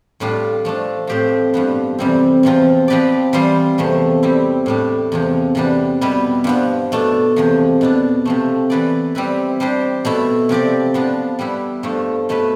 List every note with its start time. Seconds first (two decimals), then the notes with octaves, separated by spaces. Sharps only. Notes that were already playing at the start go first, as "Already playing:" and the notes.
0.20 A2 G3 D4 F4
0.65 F3 A3 D4
1.07 A2 F3 C4 G4 C5
1.54 G2 F3 B3
1.99 F2 C3 E3 G3 C4
2.43 E2 C3 F3 C4 F4
2.88 F3 C4 G4 B4 D5
3.33 E3 G3 C4 F4 C5
3.78 E2 C3 F3 A3
4.23 G3 C4 E4
4.66 A2 G3 D4
5.12 E2 C3 F3
5.55 C3 E3 G3 B3 D4
6.01 B2 G3 B3 E4 B4
6.44 G2 F3 B3
6.92 B2 A3 D4
7.36 E2 C3 F3
7.81 B2 B3 D4
8.25 C3 F3 A3
8.70 E3 B3 E4 B4 D5
9.15 G3 C4 E4 B4
9.60 G3 D4 G4 C5
10.05 B2 A3 E4
10.49 C3 F3 C4 G4 D5
10.94 F3 B3 D4
11.39 G3 B3 E4
11.83 G2 F3 A3
12.29 B2 A3 E4 B4